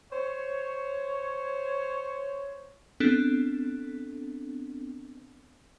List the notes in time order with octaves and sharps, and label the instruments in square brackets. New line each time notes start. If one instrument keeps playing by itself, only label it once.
[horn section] C5 C#5
[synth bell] B3 C4 D4 A4